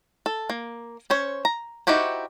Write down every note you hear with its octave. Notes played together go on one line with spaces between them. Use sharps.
A4
A#3
C#4 C5 C#5
A#5
D#4 E4 F#4 G4 C5